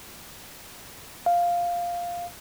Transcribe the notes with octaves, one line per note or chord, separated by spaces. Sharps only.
F5